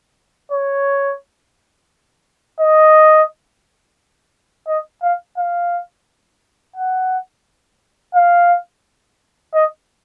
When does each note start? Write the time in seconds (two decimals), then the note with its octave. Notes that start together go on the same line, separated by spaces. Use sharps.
0.52 C#5
2.60 D#5
4.68 D#5
5.03 F5
5.37 F5
6.76 F#5
8.15 F5
9.54 D#5